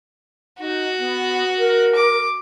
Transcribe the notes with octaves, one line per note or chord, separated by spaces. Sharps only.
D#4 F#4
B3
A#4
D6